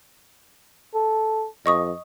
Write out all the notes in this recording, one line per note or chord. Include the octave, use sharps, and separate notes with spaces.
A4
F2 D#5 C#6 D#6